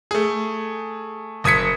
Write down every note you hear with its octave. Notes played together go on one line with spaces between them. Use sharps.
A3 G#4
F#1 D#6 G#6 B6 C#7